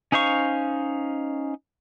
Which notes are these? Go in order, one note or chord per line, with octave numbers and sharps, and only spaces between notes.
C#4 D#4 C5 F5 C#6